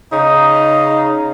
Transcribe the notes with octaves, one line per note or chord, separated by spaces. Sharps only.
C#3 D#4